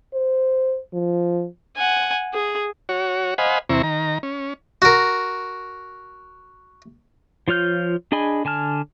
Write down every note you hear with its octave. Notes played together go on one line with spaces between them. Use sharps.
C5
F3
F#5 G#5
G#4
F#4 C#5
C5 D#5 F5 F#5 G#5 B5
E2 C3 C4 E4 A#5 C#6
D#3 A#5
C#4
F#4 A#4
F3 F4 C#5 F6 G6
D4 G#4 D#5 G#5 B5
D3 G#5 A5 F6